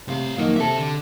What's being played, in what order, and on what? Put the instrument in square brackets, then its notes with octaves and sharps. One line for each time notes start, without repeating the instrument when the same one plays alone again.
[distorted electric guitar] C2 F5 [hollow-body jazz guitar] A2 C3
[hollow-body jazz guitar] F2 D#3 F#3 [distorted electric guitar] A#3
[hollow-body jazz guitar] C3 A4 [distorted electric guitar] C5 E5
[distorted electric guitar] D3